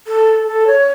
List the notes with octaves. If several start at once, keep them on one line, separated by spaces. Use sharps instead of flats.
A4
A4
C#5